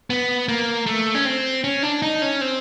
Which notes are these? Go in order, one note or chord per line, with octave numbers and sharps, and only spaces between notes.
B3
A#3
A3
C#4
C4
C#4
D4
D#4
C#4
C4